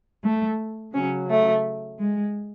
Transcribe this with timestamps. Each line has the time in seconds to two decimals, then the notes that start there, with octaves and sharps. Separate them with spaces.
0.24 A3
0.94 C#3 F#3 C#4
1.29 A3
1.99 G#3